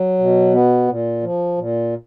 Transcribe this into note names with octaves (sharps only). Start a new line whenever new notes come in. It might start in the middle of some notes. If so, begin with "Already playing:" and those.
Already playing: F#3
B2
B3
A#2
F3
A#2